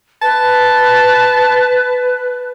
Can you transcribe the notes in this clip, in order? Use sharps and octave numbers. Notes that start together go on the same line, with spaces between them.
B4 A5